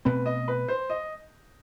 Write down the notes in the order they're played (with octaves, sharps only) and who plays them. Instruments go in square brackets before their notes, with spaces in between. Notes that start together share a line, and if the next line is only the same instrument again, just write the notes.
[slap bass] B2 A3 C4 [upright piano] B4
[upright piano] D#5
B4
C5
D#5